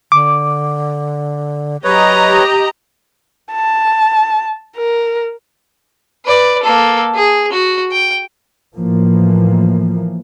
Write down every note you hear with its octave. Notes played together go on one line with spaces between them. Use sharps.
D3 D6
F#3 G4 B4 C#5 D#5 A#5
A5
A#4
B4 D5
A#3 A4
G#4
F#4
G5
A2 E3 F3 A#3